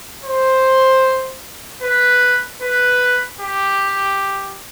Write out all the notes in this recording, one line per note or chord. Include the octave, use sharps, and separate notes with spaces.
C5
B4
B4
G4